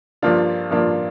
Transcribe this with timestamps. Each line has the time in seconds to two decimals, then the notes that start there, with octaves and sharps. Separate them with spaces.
0.22 G2 F3 A#3 D4 F4
0.71 G2 F3 A#3 D4 F4